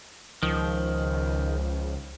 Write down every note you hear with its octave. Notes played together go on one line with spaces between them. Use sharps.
C#2 D#3 F3